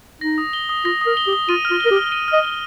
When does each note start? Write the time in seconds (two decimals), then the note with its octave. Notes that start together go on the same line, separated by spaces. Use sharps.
0.21 D#4 A#6
0.38 D#6
0.53 G7
0.69 D#6
0.85 F4 A#6
1.01 A#4 D#6
1.17 G7
1.27 G4
1.33 D#6
1.49 F4 D#7
1.65 F6
1.70 F4
1.81 A#4 G7
1.91 G4
1.96 F6
2.12 D#7
2.28 D#5 F6
2.45 G7